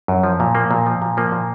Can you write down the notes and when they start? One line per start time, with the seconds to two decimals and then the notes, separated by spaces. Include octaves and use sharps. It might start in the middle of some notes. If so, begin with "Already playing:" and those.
0.08 F#2
0.24 F3
0.40 A#2
0.55 F3 A#3
0.71 A#2
0.86 F3
1.02 A#2
1.17 F3 A#3
1.32 A#2